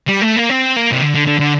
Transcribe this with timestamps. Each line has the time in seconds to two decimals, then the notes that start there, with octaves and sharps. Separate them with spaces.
0.08 G3
0.22 A3
0.36 A#3
0.49 C4
0.76 A#3
0.92 C3
1.02 D3
1.15 D3
1.27 D3
1.39 D3